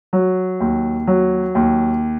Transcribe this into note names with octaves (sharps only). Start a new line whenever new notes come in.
F#3
D#2
F#3
D#2